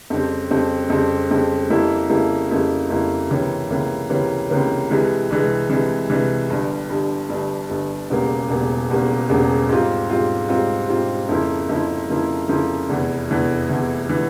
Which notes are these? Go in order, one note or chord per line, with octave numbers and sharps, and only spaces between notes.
F2 C#3 G3 C4
F2 C#3 G3 C4
F2 C#3 G3 C4
F2 C#3 G3 C4
F2 C#3 G3 A#3 E4
F2 C#3 G3 A#3 E4
F2 C#3 G3 A#3 E4
F2 C#3 G3 A#3 E4
C#2 C3 E3 A#3 C#4
C#2 C3 E3 A#3 C#4
C#2 C3 E3 A#3 C#4
C#2 C3 E3 A#3 C#4
C2 C3 E3 G#3
C2 C3 E3 G#3
C2 C3 E3 G#3
C2 C3 E3 G#3
G1 G2 G3
G1 G2 G3
G1 G2 G3
G1 G2 G3
E1 E2 C#3 G3 A#3
E1 E2 C#3 G3 A#3
E1 E2 C#3 G3 A#3
E1 E2 C#3 G3 A#3
G#2 G3 C4 F4
G#2 G3 C4 F4
G#2 G3 C4 F4
G#2 G3 C4 F4
F2 C#3 F3 A#3 E4
F2 C#3 F3 A#3 E4
F2 C#3 F3 A#3 E4
F2 C#3 F3 A#3 E4
F1 E2 E3
F1 E2 E3
F1 E2 E3
E3